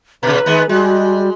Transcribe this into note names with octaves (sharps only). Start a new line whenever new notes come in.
A#2 C#3 B4
D#3 G#3 B3
G3 G#3 F#4